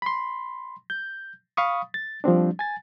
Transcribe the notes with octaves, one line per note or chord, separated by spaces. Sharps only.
B5 C6
G6
F5 B5 C#6 D#6
A6
F3 G3 C4 D4
G#5 A6